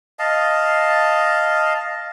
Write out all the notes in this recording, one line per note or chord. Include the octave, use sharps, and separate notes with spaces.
D#5 F5 A5